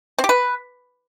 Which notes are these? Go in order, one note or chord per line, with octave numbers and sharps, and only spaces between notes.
C4
G4
B4